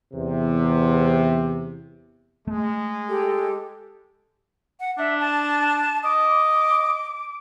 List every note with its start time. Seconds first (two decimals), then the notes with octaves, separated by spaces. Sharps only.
0.13 E2 C3
2.48 G#3 A3
3.07 G4 A4
4.80 F#5
4.98 D4 E5
5.20 A5
6.04 D#5 D6